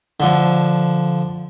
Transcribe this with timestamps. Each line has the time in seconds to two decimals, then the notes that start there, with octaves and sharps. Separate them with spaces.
0.20 D3 F3